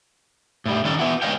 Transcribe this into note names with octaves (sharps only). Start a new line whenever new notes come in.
A2 G3
D#3 C#4 A4
B3 E4 F#4
G#3 B4 C#5 D#5 F5 G5